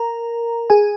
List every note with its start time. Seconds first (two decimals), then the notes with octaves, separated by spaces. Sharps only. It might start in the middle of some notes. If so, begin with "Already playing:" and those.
Already playing: A#4 A#5
0.70 G#4 G#5